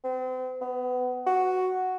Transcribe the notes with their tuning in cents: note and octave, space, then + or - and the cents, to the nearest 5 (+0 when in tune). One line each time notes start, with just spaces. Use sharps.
C4 -35
B3 +25
F#4 +0